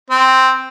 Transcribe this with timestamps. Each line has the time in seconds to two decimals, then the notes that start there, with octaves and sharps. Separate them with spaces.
0.10 C4